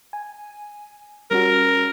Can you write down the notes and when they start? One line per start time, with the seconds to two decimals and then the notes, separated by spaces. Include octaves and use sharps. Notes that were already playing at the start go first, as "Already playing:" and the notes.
0.13 G#5
1.31 G3 C#4 F#4 A#4